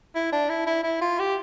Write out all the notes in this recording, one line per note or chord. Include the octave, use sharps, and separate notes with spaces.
E4
D4
E4
E4
E4
F4
G4